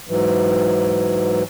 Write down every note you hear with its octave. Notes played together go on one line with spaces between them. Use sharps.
G#2 E3 F#3